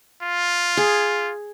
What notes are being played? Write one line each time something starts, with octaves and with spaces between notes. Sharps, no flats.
F4
G#4